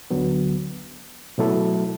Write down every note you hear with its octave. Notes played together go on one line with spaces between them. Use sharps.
D2 D3 F#3 B3
B2 F#3 A3 E4 A4